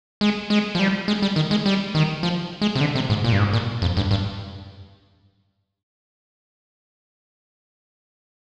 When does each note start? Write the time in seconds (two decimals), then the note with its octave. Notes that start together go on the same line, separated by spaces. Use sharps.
0.21 G#3
0.50 G#3
0.75 F3
0.79 G3
1.08 G#3
1.22 G3
1.36 D#3
1.51 G#3
1.66 G3
1.95 D#3
2.23 F3
2.61 G#3
2.75 C3
2.81 D3
2.95 C3
3.10 G#2
3.24 A#2
3.32 G2
3.39 G#2
3.53 A#2
3.82 F2
3.97 G2
4.11 G2